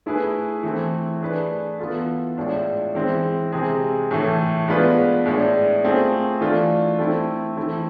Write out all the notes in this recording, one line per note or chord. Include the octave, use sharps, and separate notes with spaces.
A3 E4 G#4 B4
E3 A3 C4
A3 D4 G#4 B4
E3 B3 F4 A4
A2 G#3 D4 F4
E3 G#3 C4
C3 G#3 C4 G#4
A2 E3 A3
G#3 B3 D4 F4 B4
A2 G#3 D4
A3 C4 F4 G#4
E3 A3 D4 F4
A3 C4 E4
E3 A3 C4 E4